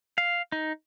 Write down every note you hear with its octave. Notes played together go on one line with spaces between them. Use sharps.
F5
D#4